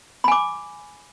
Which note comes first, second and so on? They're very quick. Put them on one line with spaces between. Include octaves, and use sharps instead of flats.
B5 G#5 D6